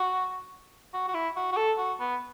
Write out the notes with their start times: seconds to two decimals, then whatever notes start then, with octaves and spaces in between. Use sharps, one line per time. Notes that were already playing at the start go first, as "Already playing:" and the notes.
Already playing: F#4
0.94 F#4
1.08 F#4
1.14 E4
1.36 F#4
1.52 F#4
1.57 A4
1.78 F#4
2.00 B3